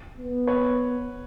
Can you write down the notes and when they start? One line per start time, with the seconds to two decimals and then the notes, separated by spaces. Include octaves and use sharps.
0.17 B3
0.47 B4 C#5